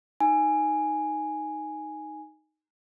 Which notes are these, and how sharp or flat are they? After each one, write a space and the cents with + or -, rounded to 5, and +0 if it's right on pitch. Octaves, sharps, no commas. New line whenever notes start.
D#4 +0 G#5 +0